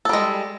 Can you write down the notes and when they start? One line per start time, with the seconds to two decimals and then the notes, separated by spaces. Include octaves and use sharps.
0.05 A4
0.09 G3
0.13 G#3